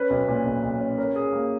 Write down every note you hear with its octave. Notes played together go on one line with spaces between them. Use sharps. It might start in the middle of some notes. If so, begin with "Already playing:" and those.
Already playing: C#4 B4
B1
A#2
B1
B1
C#4
C#4 A#4
C#4 G#4
A#3